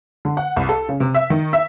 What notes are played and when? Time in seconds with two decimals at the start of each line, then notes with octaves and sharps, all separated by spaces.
0.25 D3
0.37 F#5
0.56 C2
0.69 A4
0.89 C#3
1.00 C3
1.15 E5
1.30 D#3
1.53 E5